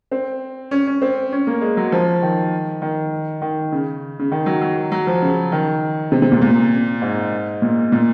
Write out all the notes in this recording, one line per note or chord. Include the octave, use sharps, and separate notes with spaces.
C4
C#4
C#4
C4
C#4
A#3
G#3
F#3
F3
D#3
D#3
D#3
C#3
C#3
D#3
F#3
F#3
F#3
F3
C#3
D#3
C3
C3
A#2
A#2
G#2
A#2
A#2